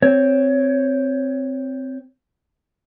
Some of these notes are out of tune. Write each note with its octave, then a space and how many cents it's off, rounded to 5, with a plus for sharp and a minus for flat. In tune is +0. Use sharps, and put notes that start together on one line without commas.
C4 +0 C#5 +10